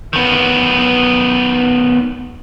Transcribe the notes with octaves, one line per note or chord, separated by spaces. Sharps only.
D#3 B3